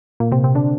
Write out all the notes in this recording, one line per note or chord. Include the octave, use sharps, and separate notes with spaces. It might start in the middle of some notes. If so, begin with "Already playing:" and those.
A#2 A#3
C3 C4
C3 C4
D3 D4